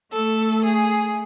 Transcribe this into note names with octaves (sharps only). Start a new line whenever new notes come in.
A3 A4
G#4